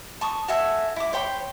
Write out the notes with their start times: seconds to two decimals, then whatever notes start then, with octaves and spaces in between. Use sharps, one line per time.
0.21 A5 C#6 D#6
0.48 F#4 A4 E5 G#5
0.96 E4 D6
1.13 C5 C#5 G5 B5